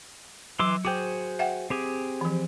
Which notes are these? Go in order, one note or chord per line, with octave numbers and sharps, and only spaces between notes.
E3 F#3 C6 D6
F#4 G#4 C5 G5 D6
E5 F#5 G5
C4 G4 G#4
E3 F3